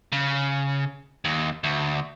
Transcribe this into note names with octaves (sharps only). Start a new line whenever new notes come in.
C#3
D#2
D2